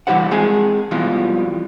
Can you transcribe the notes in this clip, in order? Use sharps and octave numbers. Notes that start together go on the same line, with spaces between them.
E3 G3 E4 G4 C5 F#5
G#3 C4 G#4 G#5
F2 B2 E3 F3 G3 F4